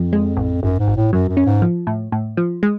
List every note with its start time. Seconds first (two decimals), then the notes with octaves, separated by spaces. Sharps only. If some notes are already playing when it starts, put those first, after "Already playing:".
Already playing: F2 F3
0.13 G#3
0.37 A1
0.62 G#1 F#2
0.79 G#2
0.88 G#1
0.96 A2
1.13 F#2 F#3
1.29 F#2
1.37 C#4
1.46 G#2
1.62 F3
1.87 A2
2.12 A2
2.37 F3
2.63 G#3